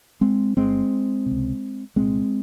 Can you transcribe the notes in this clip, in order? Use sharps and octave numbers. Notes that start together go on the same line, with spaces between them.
G#3 C4
G1 G2 G#3 C4
C3
C#2
C2 A#2 G#3 C4